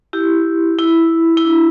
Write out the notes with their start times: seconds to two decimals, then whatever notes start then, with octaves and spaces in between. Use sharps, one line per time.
0.13 E4 G4
0.79 E4
1.37 E4
1.45 D4